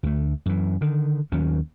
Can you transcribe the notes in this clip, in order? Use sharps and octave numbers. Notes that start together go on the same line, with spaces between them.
D2 A3
F#2 E3
D3 D#3
D#2 D#3 F#3 C#4